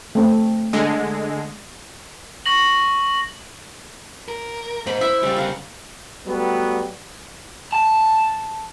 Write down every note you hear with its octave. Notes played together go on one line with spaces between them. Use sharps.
A3 C4
D3 G#3
C#6 A#6 F#7
A#4
G#2 C5 B5
E4 E5
C#3 G3 G#3 G4 D5
A#4 F5 F#5
F#3 G3 A3 B3
A5